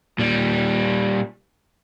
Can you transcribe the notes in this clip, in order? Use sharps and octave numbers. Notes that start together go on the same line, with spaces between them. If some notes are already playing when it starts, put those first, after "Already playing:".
A#2 G3